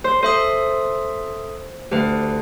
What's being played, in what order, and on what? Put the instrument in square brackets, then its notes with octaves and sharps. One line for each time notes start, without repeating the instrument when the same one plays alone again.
[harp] C5
[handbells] A4 E5 D#6 [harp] C5
[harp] D2 [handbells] G4 B4